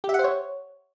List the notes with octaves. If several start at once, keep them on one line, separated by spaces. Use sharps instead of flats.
G4
E5
F#5
C5
C#5